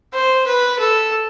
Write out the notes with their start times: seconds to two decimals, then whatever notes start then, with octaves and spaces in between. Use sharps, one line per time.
0.14 C5
0.47 B4
0.79 A4